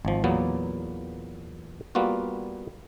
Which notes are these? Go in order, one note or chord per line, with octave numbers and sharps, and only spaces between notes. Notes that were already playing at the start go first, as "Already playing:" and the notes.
G#1 F3
E2 A#2 F#3 A#3 B3
G3 A#3 B3 F4 F#4